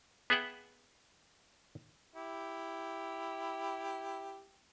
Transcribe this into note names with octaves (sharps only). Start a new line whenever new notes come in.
B3 G#4 E5 F#5 G5
E4 G4